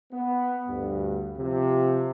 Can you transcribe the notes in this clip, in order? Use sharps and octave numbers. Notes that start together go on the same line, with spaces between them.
B3
D2 G2
C3 F3